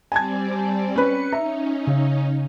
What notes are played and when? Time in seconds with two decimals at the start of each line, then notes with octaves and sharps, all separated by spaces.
0.12 G3 C4 D5 G#5 A5 G#6
0.96 C#4 B4 C#7
1.33 C#4 D#4 E5 A#5
1.87 C#3